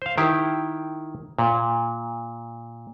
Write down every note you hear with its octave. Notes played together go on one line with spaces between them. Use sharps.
C5 F5
D#3 E4 G4
A#2